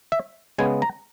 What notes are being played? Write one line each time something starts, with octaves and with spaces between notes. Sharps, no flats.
E5
C#3 G#3 B3 G#5
A#5